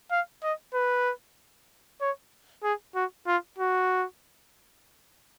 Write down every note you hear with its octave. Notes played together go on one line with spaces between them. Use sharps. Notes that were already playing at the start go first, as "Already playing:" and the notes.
F5
D#5
B4
C#5
G#4
F#4
F4
F#4